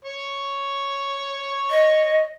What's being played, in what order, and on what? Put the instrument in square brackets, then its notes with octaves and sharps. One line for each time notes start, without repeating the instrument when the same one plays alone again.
[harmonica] C#5 C#6
[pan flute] D#5